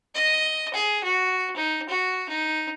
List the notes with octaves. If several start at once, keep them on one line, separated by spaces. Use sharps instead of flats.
D#5
G#4
F#4
D#4
F#4
D#4